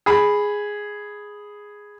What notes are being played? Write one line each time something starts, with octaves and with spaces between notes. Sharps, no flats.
G#4 B5